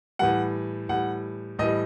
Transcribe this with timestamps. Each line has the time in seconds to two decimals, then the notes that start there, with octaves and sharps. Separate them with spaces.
0.19 A2 E3 G3 F#5
0.89 A2 E3 G3 F#5
1.59 A2 E3 G3 D#5